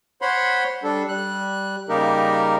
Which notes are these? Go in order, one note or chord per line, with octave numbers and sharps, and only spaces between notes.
C5 C#5 F#5 B5 C6
G3 D4 A4
G3 F#6
C#3 G3 A#3 D#4 G4 A#4